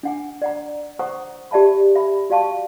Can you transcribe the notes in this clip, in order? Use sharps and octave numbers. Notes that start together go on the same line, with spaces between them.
D4 F#5 G#5
D5 F#5 A#5
C5 F#5 A#5 C#6 D#6
G4 D5 E5 A5 B5
E5 B5
F#4 D5 F5 A5 C#6